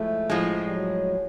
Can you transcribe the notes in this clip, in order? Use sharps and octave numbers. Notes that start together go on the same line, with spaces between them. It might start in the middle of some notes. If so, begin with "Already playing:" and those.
Already playing: A2 F3 G#3 A3
A2 F3 G#3
G3
F#3